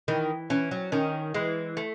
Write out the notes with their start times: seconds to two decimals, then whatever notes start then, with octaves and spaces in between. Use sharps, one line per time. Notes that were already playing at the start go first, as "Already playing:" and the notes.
0.08 D#3 E3
0.50 E3 C#4
0.71 F#3
0.92 D#3 C#4
1.34 E3 G#3
1.77 A3